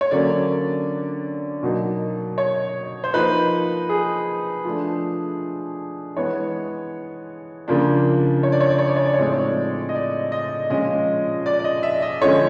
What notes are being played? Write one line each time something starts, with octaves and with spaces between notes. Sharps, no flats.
C#5
D3 F#3 A#3 C#4 D5
B2 F#3 A#3 D#4
C#5
C5
F3 A#3 D#4 B4
G#4
F3 A3 D4
E3 G#3 B3 C#5
C#3 F3 A#3 D4
C#5
D5
C#5
D5
C#5
D5
C#5
D5
C#5
A2 F3 G#3 C4 D#4 D5
C#5
D#5
D5
D#5
A#2 F3 G#3 C#4 D#5
D5
D5
D#5
E5
D#5
D3 F3 G#3 C#4 C#5